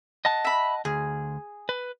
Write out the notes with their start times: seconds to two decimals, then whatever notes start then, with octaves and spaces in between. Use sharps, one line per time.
0.25 D#5 F#5 A5
0.45 E5 B5
0.85 D2 G#4
1.69 B4